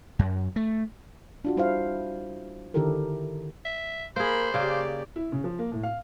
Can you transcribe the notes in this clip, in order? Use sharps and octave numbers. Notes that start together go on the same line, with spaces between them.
F#2
A3
D4 F4 F#4
G3 E4 C5 F5
D3 D#3 E4 G4 A4 A#4
E5
A#3 G#4 A#4 C5 B5
C#3 A#3 G4 D5
E4
C#3
F3
A#3
A2
F5